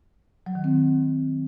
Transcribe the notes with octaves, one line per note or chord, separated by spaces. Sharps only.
F#3
D#3
C4